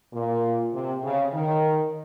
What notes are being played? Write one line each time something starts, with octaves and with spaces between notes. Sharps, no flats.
A#2
C3
C#3
D#3